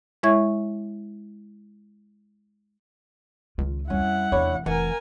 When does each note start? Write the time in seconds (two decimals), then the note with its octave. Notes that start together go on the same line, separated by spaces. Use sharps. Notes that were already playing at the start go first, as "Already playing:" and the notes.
0.23 G#3 E4 C#5 E5 C#6 G#6
3.58 C#2 D#3 F4
3.90 F2 G3 C#4 E4 F#5
4.32 F1 E2 E3 D4 C#5 B5
4.66 F1 E3 A#4 F#5 G#5